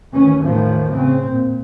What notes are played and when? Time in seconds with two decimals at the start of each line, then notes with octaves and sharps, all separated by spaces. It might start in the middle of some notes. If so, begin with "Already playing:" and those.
0.13 D2 D#3 E3 C#4
0.43 E2 A2 D#3 F3
0.93 C#3 C4
1.27 A#2